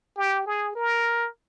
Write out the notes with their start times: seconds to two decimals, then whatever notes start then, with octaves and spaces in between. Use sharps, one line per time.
0.17 G4
0.46 G#4
0.75 A#4